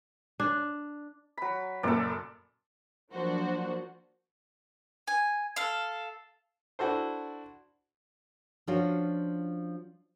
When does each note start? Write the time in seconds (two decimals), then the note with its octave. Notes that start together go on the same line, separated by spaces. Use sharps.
0.40 D4
1.38 F#3 B5
1.83 F#1 F#2 A#2 A4 D5
3.12 F3 F#3 A#3 D4 F#4 C5
5.08 G#5
5.56 A4 F5
6.79 D4 E4 F#4 A4 C5
8.67 F3 C#4 D4 F4 F#4